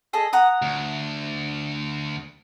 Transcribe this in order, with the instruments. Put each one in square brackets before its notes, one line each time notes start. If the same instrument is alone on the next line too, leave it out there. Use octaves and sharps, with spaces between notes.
[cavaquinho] G#4 A4 D#5
F#5 A#5 D#6
[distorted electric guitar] D2